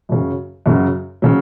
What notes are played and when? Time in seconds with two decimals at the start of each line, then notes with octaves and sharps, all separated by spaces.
0.09 F#2 C#3 F#3
0.66 F#2 C#3 F#3
1.22 C#3 F#3